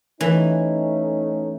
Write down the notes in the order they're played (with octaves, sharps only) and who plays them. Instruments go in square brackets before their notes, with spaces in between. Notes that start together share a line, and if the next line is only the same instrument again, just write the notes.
[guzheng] E3 [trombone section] A3 C#4 D#4